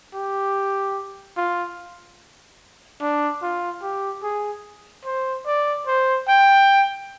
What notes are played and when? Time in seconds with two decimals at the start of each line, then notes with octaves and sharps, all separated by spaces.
0.14 G4
1.37 F4
3.01 D4
3.42 F4
3.82 G4
4.23 G#4
5.06 C5
5.46 D5
5.87 C5
6.28 G5